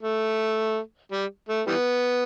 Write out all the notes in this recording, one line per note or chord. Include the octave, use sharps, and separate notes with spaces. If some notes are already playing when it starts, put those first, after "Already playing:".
A3
G3
A3
E3 G3 B3